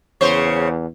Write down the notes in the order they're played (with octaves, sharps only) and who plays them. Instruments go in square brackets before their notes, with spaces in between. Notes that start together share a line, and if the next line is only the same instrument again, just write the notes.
[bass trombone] E2 [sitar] C#3 C5 C#5